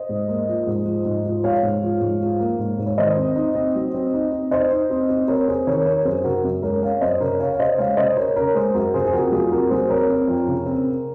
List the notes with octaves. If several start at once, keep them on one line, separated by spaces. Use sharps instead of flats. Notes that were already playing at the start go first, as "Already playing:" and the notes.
Already playing: C5 D#5
G#2
A#3
F3
G#2
F3
G#2
F3
G#2 C#5 F5
G#2
F3
G#2
F3
A#3
G#2
G#2
C#5
D#3 C5 D#5
C4
D#4
C4
F#3
C4
D#4
C4
D#4 C5 D#5
D#4
C4
C4
C4 A#4 C#5
C4 G#4 C5
D#3 A#4 C#5
D#4 A#4 C#5
F#2 G#4 C5
C#3 F#4 A#4
F#2
G#3 A#4 C#5
C#4 C#5 F5
F#2 C5 D#5
C#3 A#4 C#5
C#4 C#5 F5
F5
C#3 C5 D#5
G#3 C#5 F5
C#3 C5 D#5
C#3 A#4 C#5
C#4 A#4 C#5
G#3 G#4 C5
F#2 F#4 A#4
C#3 G#4 C5
G#4
F2 F#4 A#4
F#3 F4 G#4
C4 F#4 A#4
F#3 G#4 C5
C4 A#4 C#5
C4
F2
C#3
C4
C#3